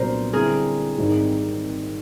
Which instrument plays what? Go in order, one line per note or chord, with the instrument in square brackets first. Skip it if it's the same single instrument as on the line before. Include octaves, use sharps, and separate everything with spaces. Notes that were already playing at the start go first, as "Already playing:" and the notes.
Already playing: [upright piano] C2 A#2 F#3 B3 D4 [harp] A#4 C5
[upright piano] D3 G3 C4 E4 [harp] G#4 A#4
[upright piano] G#1 G#2 D#3 G3 C4